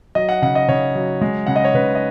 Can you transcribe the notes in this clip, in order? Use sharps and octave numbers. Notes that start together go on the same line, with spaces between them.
F#3 D#5
F#5
C#3 F#5
D#5
C#3 C#5
F#3
G#3
C#3 F#5
D#5
C#5
C#3 B4
D#5